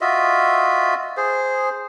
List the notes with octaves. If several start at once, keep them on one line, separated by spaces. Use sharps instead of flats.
F4 F#4 D#5 E5
G#4 C5